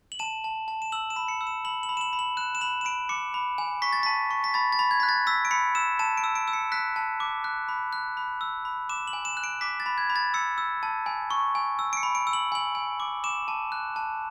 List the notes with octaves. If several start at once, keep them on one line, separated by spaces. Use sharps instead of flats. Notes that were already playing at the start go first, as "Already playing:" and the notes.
F#7
A5 E7
A5
A5
E7
E6 F#7
E7
B5
C#7
E6
E7
B5 F#7
F#7
B5
E7
F#7
B5
F#7
F#6 E7
E7
B5 F#7
E7
B5 D7
D6 C#7
B5
G#5
C#6 B6
A6
A5 B6
C#6
B6
B5 A6
A6
B5
G#6
F#6 B6
A6
E6 B6
D7
B5 C#7
E6 E7
A5 E7
D7
E6
D7
E6
C#7
F#6 B6
A5
D6
F#6
B5
F#6
B5
E6
B5
D6 E7
F#7
G#5
E7
F#6
D7
D6 B6
A6
B5
G#6
B5
A6
E6 C#7
E6
A5
G#5
C#6
G#5
E6
D7
C#7
B5
D7
E6
F#7
G#5 F#7
G#5
D6
D6 E7
A5
F#6
A5